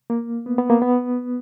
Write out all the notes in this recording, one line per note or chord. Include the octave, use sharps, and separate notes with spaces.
A#3
B3
B3
A#3
B3